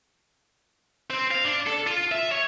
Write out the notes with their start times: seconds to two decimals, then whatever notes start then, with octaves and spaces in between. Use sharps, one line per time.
1.10 C4
1.31 F5
1.45 D4
1.67 A4
1.87 F4
2.12 E5
2.31 C#5